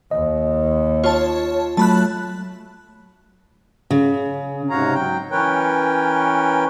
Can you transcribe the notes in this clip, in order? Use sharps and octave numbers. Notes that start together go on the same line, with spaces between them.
D#2 D#5
F4 C#5 A5
F#3 A3 A5 B5 F#6
C#3
G#2 C3 F#4 C#5 F5 A#5
F#3 G5
E3 C#4 A#4 B4 C#5 G5